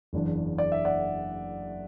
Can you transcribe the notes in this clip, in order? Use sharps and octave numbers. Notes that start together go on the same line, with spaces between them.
F#1 E2 E3 D4
D5
E5
D5 F#5